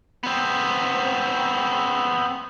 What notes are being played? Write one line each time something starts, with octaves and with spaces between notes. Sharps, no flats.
B3 C4